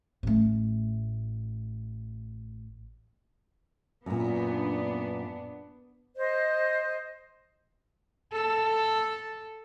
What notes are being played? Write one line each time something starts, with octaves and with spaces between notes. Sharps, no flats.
A1 A3
F#2 A#2 B3 D4
C5 D#5
A4